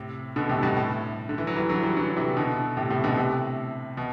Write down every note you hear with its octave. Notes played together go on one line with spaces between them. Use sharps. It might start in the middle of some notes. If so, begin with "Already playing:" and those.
Already playing: A2 C3
B2 D3
A2 C3
G2 B2
A2
D3
E3
F#3
E3 G3
D3 F#3
E3 G3
D3 F#3
C3 E3
B2 D3
A2 C3
A2 C3
B2 D3
A2 C3
B2